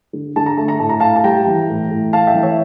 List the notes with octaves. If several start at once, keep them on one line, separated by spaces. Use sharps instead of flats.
D3
D3 A5
A#5
A3 A5
A#5
A2 A5
A#5
A2 F5 A5
A5
G3 G5 A#5
E3
A2
A2
A3 F5 A5
E5 G5
E3
C#5 E5